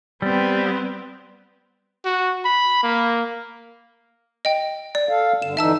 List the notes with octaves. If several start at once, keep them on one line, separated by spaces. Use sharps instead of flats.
G3 B3 C4
F#4
B5
A#3
D#5 G5
D5
A4 F5
G2 D3 E7
D3 E3 D#4 E5 A5 E6